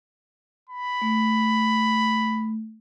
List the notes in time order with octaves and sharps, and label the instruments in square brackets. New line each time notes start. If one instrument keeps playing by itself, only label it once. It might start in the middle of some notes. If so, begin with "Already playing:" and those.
[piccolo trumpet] B5
[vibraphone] A3